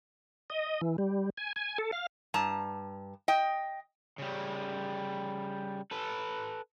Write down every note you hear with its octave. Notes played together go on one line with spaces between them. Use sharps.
D#5
E3
G3
G#5
G#5
A4
F5
G2 A5 A#5
D#5 G5
C#3 G3
A4 B4